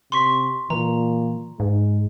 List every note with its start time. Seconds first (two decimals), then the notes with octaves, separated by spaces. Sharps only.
0.12 C3 C6 C#6 B6
0.70 A#2 E3 A#5
1.60 G#2 G#3